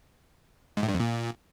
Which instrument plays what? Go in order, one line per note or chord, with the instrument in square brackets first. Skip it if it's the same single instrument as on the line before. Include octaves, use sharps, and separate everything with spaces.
[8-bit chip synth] G#2
A2
G2
F2
A#2